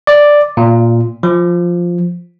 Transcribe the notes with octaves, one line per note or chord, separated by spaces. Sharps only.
D5
A#2
F3